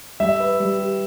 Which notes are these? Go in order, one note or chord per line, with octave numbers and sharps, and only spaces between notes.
G3 E5
B4
G3
G4